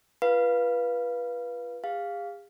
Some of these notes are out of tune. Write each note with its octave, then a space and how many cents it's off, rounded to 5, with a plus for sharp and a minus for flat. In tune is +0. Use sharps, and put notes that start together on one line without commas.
F4 -25 B4 -15 F5 +0
G#4 -40 F5 +0